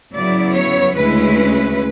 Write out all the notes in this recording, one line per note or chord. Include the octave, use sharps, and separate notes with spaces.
C#3 F#3 B3 E4 D5
C#5
D2 C#3 G#3 C#4 E4 B4